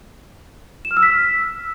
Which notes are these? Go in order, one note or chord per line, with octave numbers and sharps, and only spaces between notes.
E7
F6
E6
B6